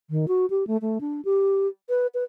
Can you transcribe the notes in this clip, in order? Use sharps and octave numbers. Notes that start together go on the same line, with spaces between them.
D#3
F#4
G4
A3
A3
D4
G4
B4
B4